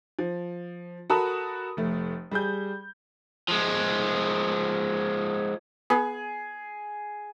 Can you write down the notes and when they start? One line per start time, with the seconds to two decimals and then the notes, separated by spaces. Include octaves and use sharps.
0.19 F3
1.10 F#4 A4 A#4 A5 B5 D#6
1.77 F1 A3
2.31 G3 G#4 G6
3.48 F3 G#3
5.90 B3 G#4